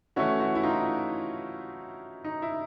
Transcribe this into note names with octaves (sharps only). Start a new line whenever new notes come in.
E3 A3 C#4 E4 F#4
E4 F#4
E4
D#4 F4
D#4
E4